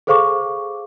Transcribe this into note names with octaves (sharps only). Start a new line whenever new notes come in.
G#4 A4 C5 F5 C#6 D6